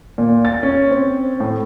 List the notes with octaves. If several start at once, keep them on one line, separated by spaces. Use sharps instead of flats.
A#2
A6
C#4
C4
A2